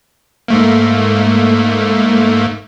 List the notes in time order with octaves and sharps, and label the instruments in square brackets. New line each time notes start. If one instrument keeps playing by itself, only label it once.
[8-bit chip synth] G#2 A3 A#3